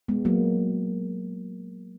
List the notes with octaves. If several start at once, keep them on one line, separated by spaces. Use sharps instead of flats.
G#3 B3
F#3 A#3